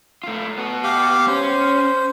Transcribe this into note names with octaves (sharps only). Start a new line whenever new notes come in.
A3 F4
B3 F#4
G4 F5
C#4 C5